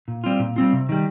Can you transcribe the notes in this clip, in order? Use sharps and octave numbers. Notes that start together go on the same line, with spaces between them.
A#2
G3 C4 F4
A#2
G3 C4 F4
C3
D#3 G3